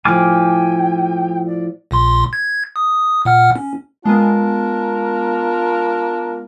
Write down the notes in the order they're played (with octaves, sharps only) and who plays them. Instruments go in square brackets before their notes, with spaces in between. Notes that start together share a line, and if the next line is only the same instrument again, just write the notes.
[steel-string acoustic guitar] A2 F3 [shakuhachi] G5 [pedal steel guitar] G#5 D6 F6
[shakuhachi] D5
[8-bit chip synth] A#1 A#2 C6
G#6
D#6
A#2 F#5 F6
C#4
[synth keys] G#3 B3 [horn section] D4 F4 A#4